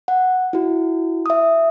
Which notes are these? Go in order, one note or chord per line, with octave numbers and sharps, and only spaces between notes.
F#5
E4 F#4
E5 D#6